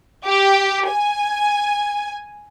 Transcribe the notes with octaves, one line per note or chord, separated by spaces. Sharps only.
G4
G#5